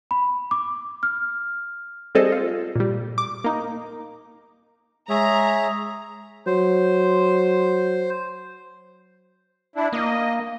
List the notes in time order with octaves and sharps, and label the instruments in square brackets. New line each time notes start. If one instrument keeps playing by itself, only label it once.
[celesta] B5
D6
F6
[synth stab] G3 C4 G#4 A4 C5 D#5
F4
A#2 G3
D6
A#3 D#4
[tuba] G#3 [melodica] G#4 C#5 E5 [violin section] A#5
[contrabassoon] F#3 [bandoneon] C5
[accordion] D4 E4
[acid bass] A#3 [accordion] D#5